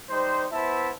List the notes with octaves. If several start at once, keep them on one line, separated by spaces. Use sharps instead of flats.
G3 D#4 C5
B3 E4 C5 E5 A5